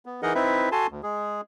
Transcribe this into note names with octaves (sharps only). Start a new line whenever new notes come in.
B3
E3 D#4 G#4 A#4 D#5 F#5
C4 D#4 E4 B4 E5
F#4 A4 G#5 A5 C6
D2
G#3 G#4